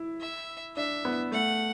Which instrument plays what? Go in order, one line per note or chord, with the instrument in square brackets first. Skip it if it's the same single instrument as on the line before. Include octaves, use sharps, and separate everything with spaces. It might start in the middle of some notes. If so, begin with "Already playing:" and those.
Already playing: [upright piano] E4
[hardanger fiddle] E5
[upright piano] D4 [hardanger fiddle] E5
[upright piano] B3
[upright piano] A3 [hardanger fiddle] F#5